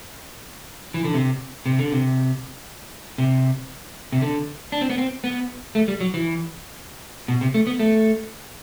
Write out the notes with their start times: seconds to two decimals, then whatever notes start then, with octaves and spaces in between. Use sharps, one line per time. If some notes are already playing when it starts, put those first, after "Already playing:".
0.94 E3
1.04 D3
1.14 C3
1.66 C3
1.79 D3
1.92 C3
3.18 C3
4.12 C3
4.22 D3
4.72 D4
4.81 C4
4.90 B3
4.98 C4
5.24 B3
5.75 A3
5.88 G3
6.00 F#3
6.14 E3
7.28 B2
7.41 C3
7.54 A3
7.67 B3
7.79 A3